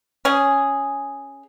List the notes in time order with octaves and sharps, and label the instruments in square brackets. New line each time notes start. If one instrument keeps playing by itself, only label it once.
[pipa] C#4 G#4